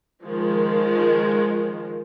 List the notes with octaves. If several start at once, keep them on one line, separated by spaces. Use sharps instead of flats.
D#3 F3 G#3